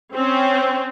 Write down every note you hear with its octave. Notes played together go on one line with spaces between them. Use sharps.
C4 C#4